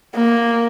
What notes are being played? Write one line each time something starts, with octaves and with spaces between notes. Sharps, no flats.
A#3